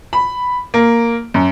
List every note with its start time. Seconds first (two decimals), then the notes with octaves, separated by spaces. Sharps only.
0.13 B5
0.74 A#3
1.34 F#2